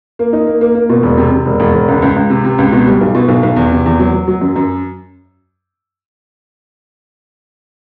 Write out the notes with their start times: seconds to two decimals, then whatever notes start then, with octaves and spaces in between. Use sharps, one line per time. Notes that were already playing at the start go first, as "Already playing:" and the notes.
0.19 A#3
0.33 D#4
0.47 A#3
0.61 A#3
0.75 A#3
0.89 B2
1.03 E1
1.18 C3
1.31 C3
1.46 E1
1.60 E1
1.74 E1
1.88 C#2
2.02 C#2
2.16 C#2
2.30 C3
2.44 C3
2.58 C#2
2.72 B2
2.87 G3
3.01 B1
3.15 B2
3.28 B1
3.43 B1
3.56 E2
3.72 C3
3.86 E2
3.99 F#3
4.13 F#3
4.28 F#3
4.41 F#2
4.56 F#2